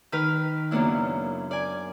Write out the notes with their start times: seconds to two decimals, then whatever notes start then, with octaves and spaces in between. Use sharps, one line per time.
0.12 D#3 B4 F6
0.71 F#2 C#3 A#3 B3 D4 E4
1.51 D5 G#5